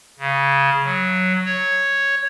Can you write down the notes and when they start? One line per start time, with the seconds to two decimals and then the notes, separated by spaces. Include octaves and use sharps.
0.19 C#3
0.84 F#3
1.45 C#5